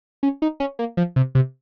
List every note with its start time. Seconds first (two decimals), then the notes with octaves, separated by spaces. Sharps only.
0.23 C#4
0.42 D#4
0.60 C#4
0.79 A#3
0.97 F3
1.16 C3
1.35 C3